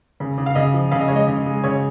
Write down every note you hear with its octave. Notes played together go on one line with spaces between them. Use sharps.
C#3
C#3
F5
C#3 D#5
F3
C#3 F5
D#5
G#3 C#5
D#5
C#3
G#3
C#3 C#5